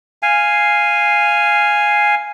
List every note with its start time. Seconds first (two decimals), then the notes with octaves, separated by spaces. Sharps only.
0.22 F5 G#5